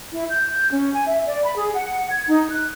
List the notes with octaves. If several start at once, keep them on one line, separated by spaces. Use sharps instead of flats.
E4
G6
C#4
G#5
E5
D5
B5
G#4
F#5
G#6
D#4
F#6